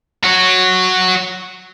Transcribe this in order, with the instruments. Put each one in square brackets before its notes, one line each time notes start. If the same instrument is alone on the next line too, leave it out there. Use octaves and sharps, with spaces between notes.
[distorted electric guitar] F#4 C#5